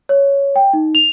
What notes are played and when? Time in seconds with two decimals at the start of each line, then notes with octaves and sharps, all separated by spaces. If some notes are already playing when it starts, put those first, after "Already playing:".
0.09 C#5
0.56 G5
0.73 D#4
0.95 F7